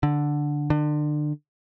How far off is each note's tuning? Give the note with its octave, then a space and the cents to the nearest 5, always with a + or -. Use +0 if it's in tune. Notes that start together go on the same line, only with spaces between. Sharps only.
D3 +0
D3 +30